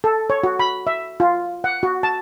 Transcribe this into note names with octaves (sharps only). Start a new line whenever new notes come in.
A4
C#5
F#4
B5
E5
F4
F#5
F#4
A5